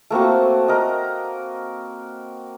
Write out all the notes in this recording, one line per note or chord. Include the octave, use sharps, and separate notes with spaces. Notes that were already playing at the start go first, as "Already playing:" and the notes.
A3 A#3 C4 F#4
A#4 D#5